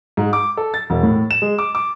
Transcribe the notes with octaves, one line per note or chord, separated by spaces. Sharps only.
G#2
D6
A4
A6
E1
A2
E7
G#3
D6
D6